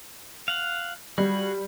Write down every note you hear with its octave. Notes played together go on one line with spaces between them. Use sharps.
F5 F#5
G3 F#4 G#4